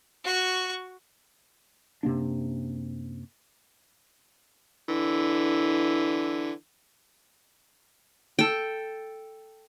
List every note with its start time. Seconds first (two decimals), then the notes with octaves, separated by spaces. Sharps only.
0.24 F#4 C#6
2.03 F#2 C3 A#3 D4
4.89 D3 E3
8.39 A4 G5